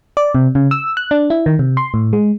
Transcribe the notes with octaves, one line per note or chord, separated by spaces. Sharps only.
D5
C3
C#3
E6
F#6
D4
E4
D#3
C3
C6
A2
G#3